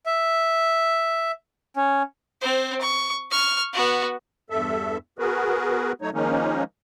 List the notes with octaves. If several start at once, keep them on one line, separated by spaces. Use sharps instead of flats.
E5
C#4
C4 C5
C#6
C#6 F6
B3 F#4
E2 G2 A4 E5
B3 F#4 G#4 A#4 B4
F#3 A3 D#4 C#5
D#3 F3 G#3 A#3 C#4 D#4